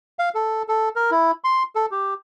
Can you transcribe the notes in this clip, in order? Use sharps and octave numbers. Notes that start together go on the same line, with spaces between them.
F5
A4
A4
A#4
E4
C6
A4
G4